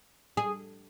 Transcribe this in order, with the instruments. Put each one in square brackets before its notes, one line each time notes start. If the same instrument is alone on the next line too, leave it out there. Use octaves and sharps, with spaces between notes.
[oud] G#4